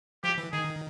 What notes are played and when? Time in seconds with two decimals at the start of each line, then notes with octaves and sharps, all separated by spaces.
0.24 F3 G4
0.38 E3
0.52 D#3 G#4